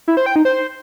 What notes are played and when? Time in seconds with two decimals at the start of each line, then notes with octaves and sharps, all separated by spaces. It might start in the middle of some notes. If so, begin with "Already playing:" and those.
0.08 E4
0.17 C5
0.26 G5
0.36 D#4
0.45 C5